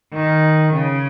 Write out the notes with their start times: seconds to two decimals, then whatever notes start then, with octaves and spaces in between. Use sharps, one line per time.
0.13 D#3
0.74 C#3